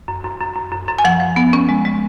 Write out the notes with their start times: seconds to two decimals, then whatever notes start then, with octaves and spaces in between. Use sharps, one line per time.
0.08 F#2
0.24 F#2
0.41 F#2
0.56 F#2
0.72 F#2
0.88 F#2
0.99 G#5
1.04 F3 F#5
1.20 F3
1.36 B3
1.53 C#4
1.69 G#3
1.85 G#3